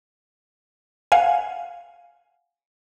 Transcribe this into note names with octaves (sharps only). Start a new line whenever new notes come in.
F5 F#5 G#5